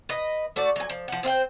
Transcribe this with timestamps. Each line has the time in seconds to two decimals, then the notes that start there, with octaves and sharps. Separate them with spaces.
0.09 B4 D#5
0.56 A3 F#4 D5
0.76 F#3 G#5
0.89 F3
1.08 F3 F#5
1.23 C4 C5 F5 G5